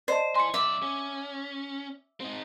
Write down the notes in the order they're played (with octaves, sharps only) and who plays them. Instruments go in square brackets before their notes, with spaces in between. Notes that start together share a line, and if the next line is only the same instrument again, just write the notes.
[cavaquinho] C5 [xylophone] D5 D#5 A5
[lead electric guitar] E4 G#5 [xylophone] C6 C#7
[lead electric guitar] F#2 D5 [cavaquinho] E5 D6
[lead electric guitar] C#4
C4 D#4